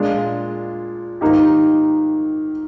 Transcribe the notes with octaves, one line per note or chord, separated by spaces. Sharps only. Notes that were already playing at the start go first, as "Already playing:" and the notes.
Already playing: A#2 G#3 D4 F4
G#2 D#3 A#3 D#4 G4